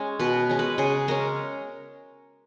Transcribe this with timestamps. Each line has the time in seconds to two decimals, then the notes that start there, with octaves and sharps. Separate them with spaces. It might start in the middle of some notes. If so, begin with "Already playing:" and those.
Already playing: G#3 C#4
0.19 B2 B4
0.49 G#3 C#4
0.59 B4
0.78 C#3 G#4
1.08 G#3 C#4 A#4